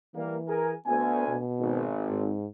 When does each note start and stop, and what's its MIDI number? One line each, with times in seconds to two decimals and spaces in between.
0.15 0.74 52
0.15 0.37 55
0.15 0.37 58
0.48 0.73 68
0.48 0.73 70
0.48 0.73 80
0.86 1.36 38
0.86 1.26 59
0.86 1.36 80
1.28 1.91 47
1.60 2.32 32
2.08 2.47 44